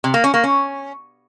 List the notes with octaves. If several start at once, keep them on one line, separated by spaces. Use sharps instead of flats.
C3
A#3
C#4
A#3
C#4